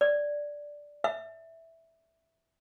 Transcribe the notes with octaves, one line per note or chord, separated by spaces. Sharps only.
D5
E5